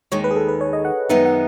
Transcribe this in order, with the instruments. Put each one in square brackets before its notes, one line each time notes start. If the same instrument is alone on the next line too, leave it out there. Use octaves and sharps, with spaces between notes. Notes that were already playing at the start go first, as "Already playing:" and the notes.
[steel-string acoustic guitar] D#2 D#3 G#3 [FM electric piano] C#5
[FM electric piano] B4
G#4
A4
B4
C#5
D#5
F#5
[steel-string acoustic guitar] F#2 D#3 G#3 B3 D#4 [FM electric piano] E5
[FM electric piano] F#5